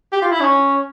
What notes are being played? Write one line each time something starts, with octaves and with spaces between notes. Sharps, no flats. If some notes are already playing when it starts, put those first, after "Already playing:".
G4
F4
E4
C#4